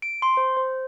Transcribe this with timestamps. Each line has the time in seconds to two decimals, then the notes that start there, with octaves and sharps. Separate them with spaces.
0.02 D7
0.22 C6
0.37 C5
0.57 C5